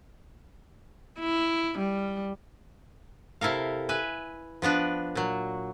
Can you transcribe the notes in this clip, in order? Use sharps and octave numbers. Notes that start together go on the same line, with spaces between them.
E4
G3
C3 E4 A4 A#4 F5
B4 E5 G#5
F3 B3 D4 B4
A#2 F#3